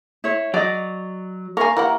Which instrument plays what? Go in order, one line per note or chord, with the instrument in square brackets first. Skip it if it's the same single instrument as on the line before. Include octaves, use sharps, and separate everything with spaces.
[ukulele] E4 C#5
[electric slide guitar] F#3 [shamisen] F#4 [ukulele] D5 D#5
[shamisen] A#3 G#5 [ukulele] A#4 F5 [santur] C#6
[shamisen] E3 G4 F#5 [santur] A#3